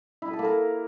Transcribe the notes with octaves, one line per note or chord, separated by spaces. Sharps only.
E4
B4
A4
A#3
A#4